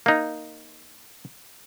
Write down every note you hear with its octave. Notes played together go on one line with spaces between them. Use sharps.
A#3 D#4